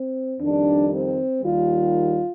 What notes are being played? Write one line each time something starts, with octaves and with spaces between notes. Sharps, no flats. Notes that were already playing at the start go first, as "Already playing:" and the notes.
Already playing: C4
F2 D#3 G3 D4
C4
D#2 D#3 G3 F4